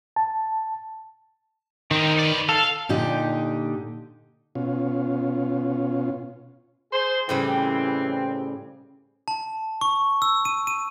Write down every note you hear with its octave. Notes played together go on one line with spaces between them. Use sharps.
A5
D#3 C4 D#4
B4 D5
A4 F5
A#2 D3 D#4 G4
B2 C#4 F4
G#4 C5
A2 C#3 E3 G3 C4
A5
C#6
E6
D#7
D#7